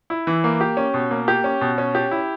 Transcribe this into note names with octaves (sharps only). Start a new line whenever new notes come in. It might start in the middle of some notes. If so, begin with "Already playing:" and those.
E4
E3
A#3
G4
C#4
B2
A#3
G4
C#4
B2
C#4
G4
E4